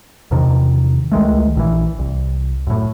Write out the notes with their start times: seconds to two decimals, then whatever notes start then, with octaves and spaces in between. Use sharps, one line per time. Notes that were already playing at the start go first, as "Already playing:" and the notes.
0.31 E2 C3 D#3
1.12 C#2 D#3 G#3 A3
1.55 A#1 D#3 E3
1.99 C2
2.67 F#2 A2